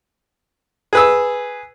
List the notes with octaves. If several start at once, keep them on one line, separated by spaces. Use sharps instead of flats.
G#4 B4 E6